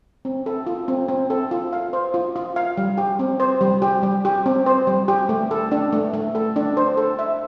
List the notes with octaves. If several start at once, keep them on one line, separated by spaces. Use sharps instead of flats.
C4
A4
F4
C4
C4
A4
F4
F5
C5
F4
F4
F5
G3
G4
C4
C5
G3
G4
G3
G4
C4
C5
G3
G4
A3
A4
D4
A3
A3
A4
D4
C5
A4
E5